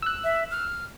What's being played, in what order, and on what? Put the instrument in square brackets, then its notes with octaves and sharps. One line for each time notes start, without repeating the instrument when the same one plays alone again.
[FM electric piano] E6 F#6
[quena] E5
F6